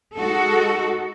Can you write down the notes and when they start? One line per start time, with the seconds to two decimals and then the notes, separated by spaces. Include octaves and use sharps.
0.15 G#3 D#4 F#4 A4